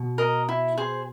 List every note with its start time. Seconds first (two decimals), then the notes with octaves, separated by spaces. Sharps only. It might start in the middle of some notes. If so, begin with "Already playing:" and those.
Already playing: B2
0.18 A#4 D#5
0.49 E4
0.78 G#4 C5